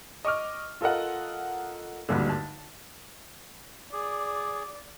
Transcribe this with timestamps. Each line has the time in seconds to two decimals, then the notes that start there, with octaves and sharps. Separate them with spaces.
0.25 D#5 C#6 D6 F6
0.81 F4 A4 A#4 D#5 F#5
2.09 G#1 D2 G2 A#2 D3
2.29 A5
3.93 G#4 D5 D6